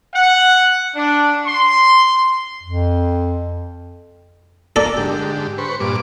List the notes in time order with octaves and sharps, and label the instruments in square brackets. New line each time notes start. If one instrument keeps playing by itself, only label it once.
[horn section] F#5
D4
C6
[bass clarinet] F2
[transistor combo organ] F#2 A#4 [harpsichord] A4 D5
[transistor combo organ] G#2 D3 G4
B4 C5 C#6
G2 A#2 D6